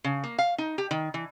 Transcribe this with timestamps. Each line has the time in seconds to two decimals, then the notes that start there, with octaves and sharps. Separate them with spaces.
0.04 C#3
0.24 A#3
0.38 F5
0.58 D#4
0.78 G4
0.91 D#3
1.14 E3